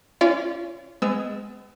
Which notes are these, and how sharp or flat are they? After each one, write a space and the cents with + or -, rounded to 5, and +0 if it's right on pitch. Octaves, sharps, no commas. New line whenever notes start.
C#4 +0 F4 -35 D5 -30
G#3 +0 B3 +40 E6 +0